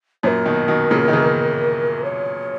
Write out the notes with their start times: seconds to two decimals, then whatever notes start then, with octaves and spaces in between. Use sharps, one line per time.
0.23 F#2 A#2 A#4 C#5
0.46 B2 D#3
0.68 B2 D#3
0.91 A#2 C#3
1.08 D#3
1.13 C#3 E3
2.04 C#5